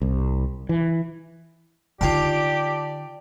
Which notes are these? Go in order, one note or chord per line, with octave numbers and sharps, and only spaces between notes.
C2
E3
D3 D#4 F4 G4 D5 G5 A5